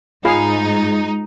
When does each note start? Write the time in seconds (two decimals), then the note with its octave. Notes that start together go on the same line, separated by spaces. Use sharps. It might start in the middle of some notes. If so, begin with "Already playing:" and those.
0.25 G#2 D#4 F4 G#4 F5